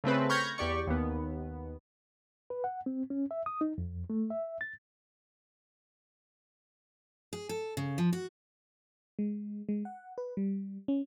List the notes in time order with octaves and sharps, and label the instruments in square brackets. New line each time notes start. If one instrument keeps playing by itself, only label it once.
[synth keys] C#3 A3 C4 B4
B5 C#6 F6 G6 G#6 A#6
E2 G4 D5 C#6
D#2 B3
[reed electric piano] B4
F#5
C4
C#4
E5
D#6
D#4
F2
A3
E5
A6
[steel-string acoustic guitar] G#4
A4
C#3
F3
F#4
[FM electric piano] G#3
G#3
F#5
B4
G3
C#4